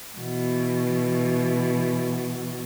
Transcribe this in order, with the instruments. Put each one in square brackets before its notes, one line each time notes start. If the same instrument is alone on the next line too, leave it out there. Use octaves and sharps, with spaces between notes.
[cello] B2 E3